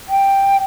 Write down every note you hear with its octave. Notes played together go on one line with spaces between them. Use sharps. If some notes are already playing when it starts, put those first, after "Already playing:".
G5